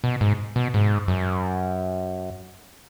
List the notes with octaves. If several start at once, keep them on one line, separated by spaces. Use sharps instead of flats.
B2
G#2
B2
G#2
F#2